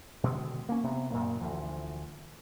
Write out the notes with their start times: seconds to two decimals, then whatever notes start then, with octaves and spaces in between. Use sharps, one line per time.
0.23 B2 D3 D#3 G#3
0.69 A#3 C#4
0.83 C3 B3
1.11 F#2 A#2 C#3 A#3
1.40 D2 E3 F3